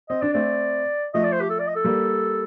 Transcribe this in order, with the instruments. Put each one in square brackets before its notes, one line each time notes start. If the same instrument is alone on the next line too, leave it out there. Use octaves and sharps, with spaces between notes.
[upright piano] C4 [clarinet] D#5
[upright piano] D4 [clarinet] D5
[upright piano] A3 C4 [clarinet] D5
[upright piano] F3 A3 [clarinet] D#5
[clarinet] D5
C5
G4
A4
D5
D#5
A4
[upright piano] G3 A#3